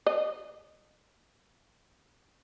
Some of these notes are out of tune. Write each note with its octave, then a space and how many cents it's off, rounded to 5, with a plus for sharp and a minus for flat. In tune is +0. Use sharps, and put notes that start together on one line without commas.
D#5 -20